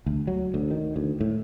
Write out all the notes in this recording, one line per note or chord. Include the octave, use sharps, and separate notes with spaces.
D2
F#3
D2
D#3
D2
A2